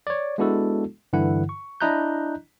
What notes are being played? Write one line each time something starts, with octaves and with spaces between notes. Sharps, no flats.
C#5 D5
G#3 B3 D4 E4 F#4 A4
G2 D3 E3 E4 F#5
C#6
D4 E4 D#5 A#5 F#6 G6